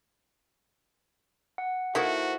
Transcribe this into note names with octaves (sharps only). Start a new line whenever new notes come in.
F#5
D#3 A#3 E4 F#4 A4 C5